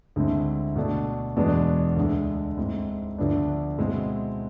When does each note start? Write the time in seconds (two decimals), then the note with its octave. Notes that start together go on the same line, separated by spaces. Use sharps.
0.16 D2 D3 G#3 C4 E4
0.76 B2 A3 D4
1.36 E2 B2 G#3 B3 D4
1.96 D2 D3 G#3
2.57 G#2 G#3 C4 E4
3.18 D2 D3 F3 B3 D4
3.78 B2 G#3 C4 E4